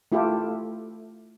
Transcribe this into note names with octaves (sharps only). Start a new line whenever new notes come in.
A3 E4 F4 G4 A4